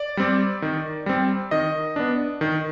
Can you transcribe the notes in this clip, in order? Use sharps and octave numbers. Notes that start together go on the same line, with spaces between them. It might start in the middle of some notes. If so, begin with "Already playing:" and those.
Already playing: D5
G3 C4
D#3
G3 C4
D#3 D#5
B3 D4
D#3